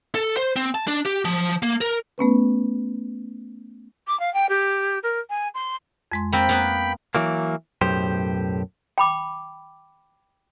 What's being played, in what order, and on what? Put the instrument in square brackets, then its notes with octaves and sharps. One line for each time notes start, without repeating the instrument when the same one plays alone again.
[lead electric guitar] A4
C5
C4
A5
D4
G4
F3
A#3
A#4
[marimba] A3 B3 C#4 B4
[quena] D6
F5
G5
G4
A#4
G#5
C6
[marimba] F2 G#3 C6
[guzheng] A#3 C4 [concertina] G5 B5
[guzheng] A#3 B3 B4
[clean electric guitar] E3 F#3 A#3
B1 F#2 A2 G4 C5
[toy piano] G5 B5 D6